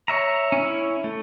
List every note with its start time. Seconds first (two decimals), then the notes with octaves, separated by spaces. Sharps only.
0.08 C#5 E5 A#5
0.52 C#4 E4
1.04 A3